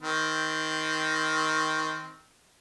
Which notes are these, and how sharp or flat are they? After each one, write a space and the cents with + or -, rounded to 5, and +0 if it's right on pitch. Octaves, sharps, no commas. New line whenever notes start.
D#3 +15 C4 -10